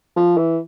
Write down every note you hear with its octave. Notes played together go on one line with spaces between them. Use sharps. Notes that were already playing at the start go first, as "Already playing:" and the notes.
F3
E3